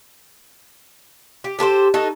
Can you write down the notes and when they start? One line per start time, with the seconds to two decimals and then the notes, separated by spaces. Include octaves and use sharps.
1.44 G4
1.59 G4 A4 A#4 C5
1.94 D#4 F#4 A4